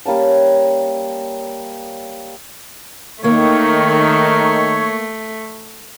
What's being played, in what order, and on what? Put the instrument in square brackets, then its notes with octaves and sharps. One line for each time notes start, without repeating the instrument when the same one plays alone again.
[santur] G3 A#3 C#4 A5
[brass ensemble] D#3 [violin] A3 [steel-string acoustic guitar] A#3 [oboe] C#5